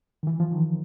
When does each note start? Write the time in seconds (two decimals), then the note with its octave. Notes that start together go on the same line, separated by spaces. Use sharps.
0.23 D#3
0.27 E3
0.40 F3
0.52 D#3